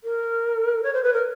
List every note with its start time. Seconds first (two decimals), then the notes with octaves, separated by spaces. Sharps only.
0.04 A#4
0.83 C#5
0.93 C5
1.03 B4
1.13 A#4